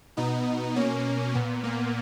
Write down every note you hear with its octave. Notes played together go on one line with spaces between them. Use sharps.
B2 B3 D#4
B2 A#3 C#4
A#2 B3
A#3